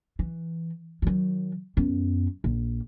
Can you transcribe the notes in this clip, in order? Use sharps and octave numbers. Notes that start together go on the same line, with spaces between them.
E3
D#3 F#3
F#2 B3
A#1